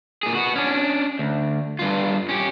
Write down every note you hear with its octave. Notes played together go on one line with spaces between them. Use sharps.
A#2 G#4
B3 F#4
C#4 D4
D2
G2 F4
C#4 G4